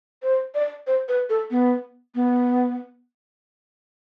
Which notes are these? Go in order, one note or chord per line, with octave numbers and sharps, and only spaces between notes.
C5
D5
C5
B4
A4
B3
B3